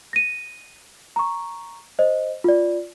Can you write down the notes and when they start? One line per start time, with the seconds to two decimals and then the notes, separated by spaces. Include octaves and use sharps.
0.13 A#6 D#7
1.16 A#5 C#6
1.99 C5 D#5
2.44 F4 D5